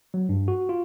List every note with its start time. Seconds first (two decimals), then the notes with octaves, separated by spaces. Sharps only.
0.14 F#3
0.29 G2
0.48 F#4
0.69 F4